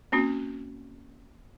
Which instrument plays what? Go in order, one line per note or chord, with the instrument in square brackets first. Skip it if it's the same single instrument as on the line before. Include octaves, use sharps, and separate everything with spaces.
[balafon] A#3 C4 C#4 F#4